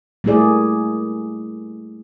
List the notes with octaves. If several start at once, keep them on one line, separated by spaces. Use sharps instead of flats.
G3 A3 A#3 E4 G#4 D5